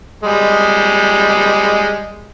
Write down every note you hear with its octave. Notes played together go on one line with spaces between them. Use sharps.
G3 G#3